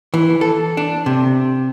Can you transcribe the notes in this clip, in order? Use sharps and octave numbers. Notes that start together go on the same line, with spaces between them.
E3
A4
D4
C3